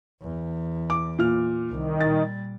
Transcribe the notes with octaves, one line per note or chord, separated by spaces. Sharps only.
E2
D6
A#2 F6
C2 D#3
A#2 G3 A6